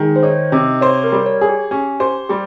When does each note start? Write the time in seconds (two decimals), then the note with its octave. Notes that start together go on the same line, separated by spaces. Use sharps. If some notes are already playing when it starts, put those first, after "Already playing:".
Already playing: D#3 G#3
0.16 C5
0.23 D#4 C#5
0.52 C3 D#5
0.81 C5 C#5
1.04 A#4
1.12 G3
1.26 C#5
1.41 G#4
1.49 G4
1.71 C#4 G4
2.00 G4 C5
2.29 G3 G4